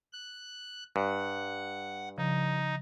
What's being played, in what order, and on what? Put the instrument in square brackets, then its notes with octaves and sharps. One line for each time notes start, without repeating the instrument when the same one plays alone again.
[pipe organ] F#6
[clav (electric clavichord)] G2 [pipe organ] F#5
[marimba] C#3 F3 [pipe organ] D#4